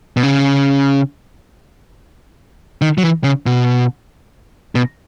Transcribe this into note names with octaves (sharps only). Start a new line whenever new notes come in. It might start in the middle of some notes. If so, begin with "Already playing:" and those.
B2
C#3
D#3
F#3
E3
C#3
B2
B2